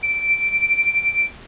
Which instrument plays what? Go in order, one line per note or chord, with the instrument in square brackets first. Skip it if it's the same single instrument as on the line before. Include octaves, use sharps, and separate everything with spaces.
[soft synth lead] D7